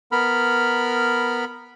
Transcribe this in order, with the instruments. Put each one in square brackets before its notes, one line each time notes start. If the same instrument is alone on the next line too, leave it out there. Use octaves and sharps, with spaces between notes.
[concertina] B3 A#4 B5 F6